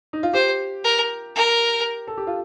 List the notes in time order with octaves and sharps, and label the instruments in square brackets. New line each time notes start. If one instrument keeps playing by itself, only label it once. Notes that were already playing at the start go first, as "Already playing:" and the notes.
[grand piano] D#4
F4
[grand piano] G4 [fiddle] C5
[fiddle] A#4
A#4
[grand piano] A4
G4
F4